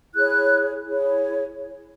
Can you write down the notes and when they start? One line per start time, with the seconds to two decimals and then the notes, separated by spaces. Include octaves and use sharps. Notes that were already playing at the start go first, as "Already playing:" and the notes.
0.14 E4 G#4 C#5 F#6
0.86 E4 G#4 C#5